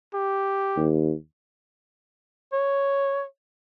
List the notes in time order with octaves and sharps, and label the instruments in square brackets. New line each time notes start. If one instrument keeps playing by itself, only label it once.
[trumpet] G4
[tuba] D#2
[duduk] C#5